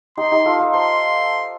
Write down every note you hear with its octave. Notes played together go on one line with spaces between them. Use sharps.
D#4 G4 C6
D#4 G4
F4 A4
F4 A4
A4 C5 C6